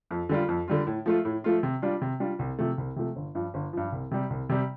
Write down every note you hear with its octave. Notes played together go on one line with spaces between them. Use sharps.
F2
D3 G3 F4
F2
D3 G3 F4
A2
F3 A3 F4
A2
F3 A3 F4
C3
G3 D4 F4
C3
G3 D4 F4
C2
C3 F3 A3
C2
C3 F3 A3
G1
G2 F3
G1
G2 F3
C2
C3 G3
C2
C3 G3